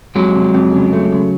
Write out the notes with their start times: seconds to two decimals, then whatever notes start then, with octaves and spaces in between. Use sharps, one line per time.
0.15 F2 F#3 G#3
0.35 C3
0.54 F2
0.73 C#3
0.93 A3
1.12 C#3